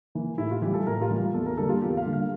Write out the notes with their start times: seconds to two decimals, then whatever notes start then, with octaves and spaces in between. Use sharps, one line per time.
0.15 E3 A#3
0.38 A2 E4
0.51 F4
0.62 E3 G3 G4
0.74 A4
0.87 A2 A#4
1.02 F4
1.11 E3 G3
1.34 E2 A4
1.46 A#4
1.57 D3 G3 A#3 A4
1.69 F4
1.82 E2 G4
1.97 F5
2.06 D3 G3 A#3
2.13 F5